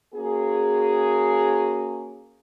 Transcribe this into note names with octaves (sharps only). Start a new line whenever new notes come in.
A#3 C#4 F#4 G#4